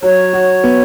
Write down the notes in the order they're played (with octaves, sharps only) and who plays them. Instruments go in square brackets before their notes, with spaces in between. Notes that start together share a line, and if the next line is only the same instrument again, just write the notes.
[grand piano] F#3 [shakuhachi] C#5
[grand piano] F#4
B3